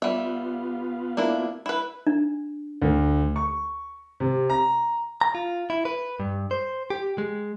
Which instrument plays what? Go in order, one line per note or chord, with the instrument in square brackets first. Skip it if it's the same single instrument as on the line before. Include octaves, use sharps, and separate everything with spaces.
[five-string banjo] G3 E5 [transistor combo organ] B3 F4
[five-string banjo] A#3 D4 E4
E4 B4
[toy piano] D4
[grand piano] D2
C#6
C3
A#5
[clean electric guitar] A#5
F4
E4
B4
G2
C5
G4
G#3